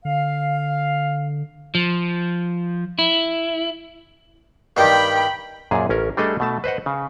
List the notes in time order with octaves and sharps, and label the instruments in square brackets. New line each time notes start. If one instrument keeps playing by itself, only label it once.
[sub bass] D3 [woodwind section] F5
[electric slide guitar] F3
E4
[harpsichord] G2 D#3 G3 [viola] G5 B5
[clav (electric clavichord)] F#2 A#2 G#4
A1 C#4 A#4
G3 A3 D4 G#4 A4 D#5
B2 A3 A5
B4 C5 D#5 F#5
C#3